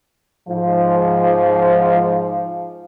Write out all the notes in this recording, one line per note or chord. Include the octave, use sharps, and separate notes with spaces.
G#2 F3